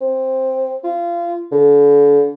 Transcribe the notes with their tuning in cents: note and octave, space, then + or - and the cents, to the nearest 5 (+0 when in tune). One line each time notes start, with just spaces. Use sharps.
C4 +5
F4 -25
D3 -40